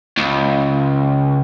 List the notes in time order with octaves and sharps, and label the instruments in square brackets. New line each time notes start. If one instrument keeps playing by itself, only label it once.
[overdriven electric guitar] C#2